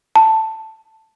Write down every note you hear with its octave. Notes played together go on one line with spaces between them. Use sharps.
A5